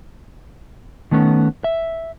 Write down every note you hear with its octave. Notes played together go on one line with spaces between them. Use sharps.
D#3 A3 B3 C#4
E5